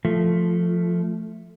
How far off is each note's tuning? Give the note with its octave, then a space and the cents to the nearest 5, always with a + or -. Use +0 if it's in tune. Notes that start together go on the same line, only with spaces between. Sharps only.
F3 +0 A3 +0